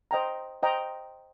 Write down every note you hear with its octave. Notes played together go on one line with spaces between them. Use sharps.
C5 D#5 G5 A#5
C5 D#5 G5 A#5